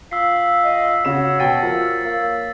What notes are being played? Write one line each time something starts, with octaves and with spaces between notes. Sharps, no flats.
F4 E6 B6 C7
D#5
C#3 F#4 C#5 E7
B2 G5 E6 A6 D#7
F3 A#4
A#3